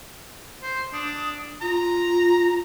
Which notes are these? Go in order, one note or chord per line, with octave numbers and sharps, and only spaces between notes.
C5
D4 D#6
F4 A#5